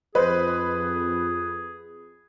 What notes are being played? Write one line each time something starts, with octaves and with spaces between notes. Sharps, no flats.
F2 G#4 B4 C5 D#5